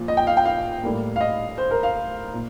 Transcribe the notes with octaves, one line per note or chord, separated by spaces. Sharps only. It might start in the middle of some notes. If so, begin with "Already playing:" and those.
Already playing: A#2 F3
D#5
G5
F5
G5
F5
A2 G3 A#3
F5
D#5
C5
A#4
F5
A#2